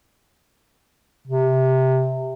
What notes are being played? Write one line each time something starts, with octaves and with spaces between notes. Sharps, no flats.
C3